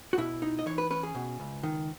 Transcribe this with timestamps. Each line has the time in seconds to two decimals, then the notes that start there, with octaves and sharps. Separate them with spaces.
0.13 F#4
0.18 B2 E4
0.42 D#4
0.59 D#5
0.66 E3 C#5
0.78 B4
0.91 C#4 B4
1.03 G#4
1.15 B2
1.40 C#2
1.63 D#3